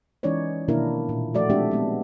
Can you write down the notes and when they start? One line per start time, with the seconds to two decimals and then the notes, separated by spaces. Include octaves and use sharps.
0.23 E3 G#3 C#4 D#4 C#5 D5
0.68 B2 D#3 A#3 D4 E4 A#4
1.09 A#2
1.34 F3 A3 F#4 D5
1.49 G#3 A3 C4 D4 G4 E5
1.71 G#3 B3 C4